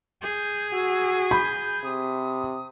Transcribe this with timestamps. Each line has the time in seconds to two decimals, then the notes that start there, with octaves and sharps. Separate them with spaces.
0.23 G#4 G6
0.73 F#4 E6
1.31 B5 G6
1.84 C3 D#6